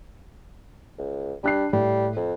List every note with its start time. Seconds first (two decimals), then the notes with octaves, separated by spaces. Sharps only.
0.98 C#2
1.44 G3 D4 F#6 C7
1.73 A2 G3
2.16 F2